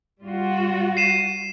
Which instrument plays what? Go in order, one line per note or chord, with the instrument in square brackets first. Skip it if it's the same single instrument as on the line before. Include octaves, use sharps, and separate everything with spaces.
[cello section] G3 F4 F#4
[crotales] C7 D#7 E7